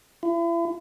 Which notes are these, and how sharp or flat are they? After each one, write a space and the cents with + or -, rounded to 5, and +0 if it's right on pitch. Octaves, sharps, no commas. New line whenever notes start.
E4 +40